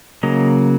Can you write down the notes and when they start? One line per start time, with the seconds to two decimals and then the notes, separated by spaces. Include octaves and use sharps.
0.23 C#3 F#3 A#3 D#5